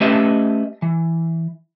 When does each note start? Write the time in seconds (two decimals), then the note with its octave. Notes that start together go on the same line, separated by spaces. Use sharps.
0.01 A3 C#4 G4 B4 D#5 E5
0.82 E3